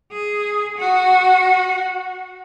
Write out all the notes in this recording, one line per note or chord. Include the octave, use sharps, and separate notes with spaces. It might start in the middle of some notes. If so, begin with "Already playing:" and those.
G#4
F#4